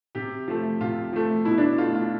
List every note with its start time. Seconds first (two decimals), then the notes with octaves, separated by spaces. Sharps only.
0.15 C3 G4
0.48 F3 A3
0.81 C3 F4
1.13 F3 A3
1.45 B2 E4
1.58 D4
1.62 E4
1.78 A3 F4
1.95 F4